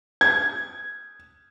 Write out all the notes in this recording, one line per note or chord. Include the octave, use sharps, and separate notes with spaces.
G#6